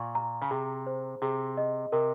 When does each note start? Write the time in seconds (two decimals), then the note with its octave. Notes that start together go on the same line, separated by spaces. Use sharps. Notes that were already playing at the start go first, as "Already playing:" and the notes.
Already playing: A#2 C#6
0.15 A#5
0.42 C#3
0.51 C3 G#4
0.87 C5
1.22 C3 G#4
1.57 D#5
1.92 C3 A#4